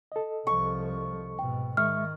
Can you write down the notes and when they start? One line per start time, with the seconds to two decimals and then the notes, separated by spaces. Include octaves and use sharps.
0.12 A4 D#5
0.47 C2 F3 C#6
1.39 G#2 B2 G5
1.77 D#3 G#3 E5 C#6 F6